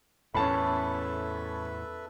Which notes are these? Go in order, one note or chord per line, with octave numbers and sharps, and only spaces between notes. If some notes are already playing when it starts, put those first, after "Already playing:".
E2 A2 C#4 A4 B4 E5 A5 B5